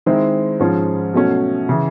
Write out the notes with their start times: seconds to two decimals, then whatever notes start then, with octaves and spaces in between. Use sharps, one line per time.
0.06 D#3 G#3 C4 E4
0.60 G#2 F3 G#3 C#4 F4
1.13 B2 F#3 A3 C#4
1.69 C#3 E3